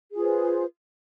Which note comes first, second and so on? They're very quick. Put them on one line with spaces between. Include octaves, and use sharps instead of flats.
G#4 F4 B4 C5